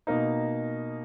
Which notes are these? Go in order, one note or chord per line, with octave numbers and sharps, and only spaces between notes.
B2 A#3 D#4